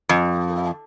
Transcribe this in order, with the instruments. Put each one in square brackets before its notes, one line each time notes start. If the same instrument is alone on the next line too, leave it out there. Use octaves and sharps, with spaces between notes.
[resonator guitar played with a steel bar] F2